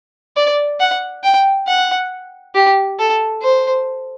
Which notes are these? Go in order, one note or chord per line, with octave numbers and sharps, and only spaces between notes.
D5
F#5
G5
F#5
G4
A4
C5